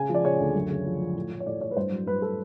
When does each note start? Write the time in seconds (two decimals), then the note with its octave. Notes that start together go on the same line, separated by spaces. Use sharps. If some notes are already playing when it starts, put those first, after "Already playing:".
Already playing: C#3 G#5
0.09 F3
0.14 D5
0.25 C#3 C#5
0.40 D2
0.55 F#2
0.70 C#3
0.85 F3
1.01 F3
1.15 A2
1.31 A2
1.40 C#5
1.46 A2 D5
1.61 A2 C#5
1.71 B4
1.77 G2 C5
1.92 F#3
2.07 G2 B4
2.22 A4